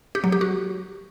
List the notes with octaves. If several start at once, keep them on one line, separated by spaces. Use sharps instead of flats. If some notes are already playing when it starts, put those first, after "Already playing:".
G4
F#3
G4
F#4